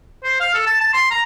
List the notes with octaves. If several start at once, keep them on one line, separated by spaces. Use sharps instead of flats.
C5
F5
A4
A5
A5
C6
A#5